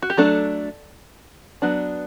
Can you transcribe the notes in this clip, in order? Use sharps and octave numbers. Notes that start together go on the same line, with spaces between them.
F#4
G4
F#3 A3 D4 A4
F#3 B3 D4